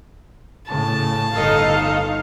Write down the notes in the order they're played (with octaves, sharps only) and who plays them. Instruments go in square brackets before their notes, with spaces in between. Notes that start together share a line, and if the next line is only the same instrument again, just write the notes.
[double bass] A2 C#3 [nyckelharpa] A5
[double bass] G1 [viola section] D#4 A4 D#5 [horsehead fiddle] F5